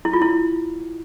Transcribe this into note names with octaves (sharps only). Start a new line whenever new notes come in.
E4
F4
E4